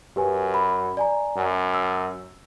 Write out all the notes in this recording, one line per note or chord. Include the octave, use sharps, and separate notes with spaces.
F#2 G4 B4 G#5
B5
D5 G#5 A#5
F#2
E6